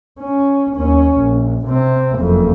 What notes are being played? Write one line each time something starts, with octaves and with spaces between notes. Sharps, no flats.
C#4
D#2 C#4
A#1
C3 C4
F#1 F2